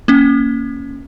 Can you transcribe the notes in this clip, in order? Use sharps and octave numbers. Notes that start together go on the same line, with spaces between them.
A#3 C#4